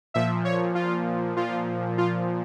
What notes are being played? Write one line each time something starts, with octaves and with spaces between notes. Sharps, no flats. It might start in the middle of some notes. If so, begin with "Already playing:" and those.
A#2 F3 E5
C#5
F4
A#2 F3 F4
F4